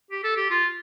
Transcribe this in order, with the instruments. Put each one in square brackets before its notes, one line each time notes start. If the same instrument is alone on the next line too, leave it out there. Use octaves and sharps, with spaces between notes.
[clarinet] G4
A4
G4
F4